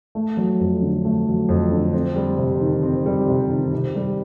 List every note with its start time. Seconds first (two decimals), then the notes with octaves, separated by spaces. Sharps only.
0.15 A3
0.37 F#3
0.60 F2
0.82 D3
1.05 A3
1.27 F#3
1.49 F2
1.72 D3
1.93 C4
2.15 G3
2.38 C3
2.61 D#3
2.83 C4
3.06 G3
3.28 C3
3.51 D#3
3.72 C3
3.95 G3